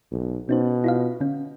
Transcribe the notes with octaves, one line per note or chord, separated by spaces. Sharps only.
B1
B2 C#4 D#4 C5
E4 F4 F5
D3 C#4